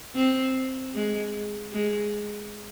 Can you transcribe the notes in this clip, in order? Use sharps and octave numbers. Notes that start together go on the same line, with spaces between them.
C4
G#3
G#3